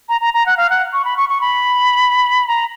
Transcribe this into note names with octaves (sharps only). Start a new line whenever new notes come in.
A#5
A#5
A#5
F#5
F5
F#5
C#6
B5
C#6
C#6
B5
A#5